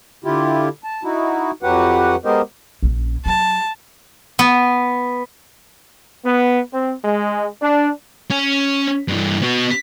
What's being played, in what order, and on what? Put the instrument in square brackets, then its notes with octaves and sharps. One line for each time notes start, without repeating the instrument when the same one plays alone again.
[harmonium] D3 E4 F4 G4
A5
D#4 E4 F#4
F2 F#3 F#4 G4 B4 F#5
G#3 B3 G4 A#4 C5 D#5
[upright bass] A#1 C#4
[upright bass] F#3 [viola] A5
[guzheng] B3
[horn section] B3
C4
G#3
D4
[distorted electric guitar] C#4
G2 E3
B3 F#4